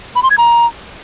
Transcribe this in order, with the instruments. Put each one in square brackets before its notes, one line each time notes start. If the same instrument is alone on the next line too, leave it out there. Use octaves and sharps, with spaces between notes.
[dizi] B5
C6
G#6
A#5